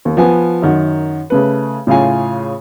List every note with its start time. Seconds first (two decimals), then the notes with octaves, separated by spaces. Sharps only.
0.05 D#2
0.17 F3 B3 G#5
0.62 F#2 D#3 F#4
1.30 C#3 A3 B4
1.87 A2 C#3 F4 F5 G#5